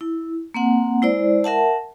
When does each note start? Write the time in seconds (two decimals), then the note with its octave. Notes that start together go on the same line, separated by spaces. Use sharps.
0.01 E4
0.54 A#3 C4 F#5
1.02 G#3 E4 C5 D5
1.44 A#4 E5 F#5 A5